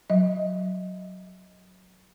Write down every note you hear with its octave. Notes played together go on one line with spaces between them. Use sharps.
F#3 D#5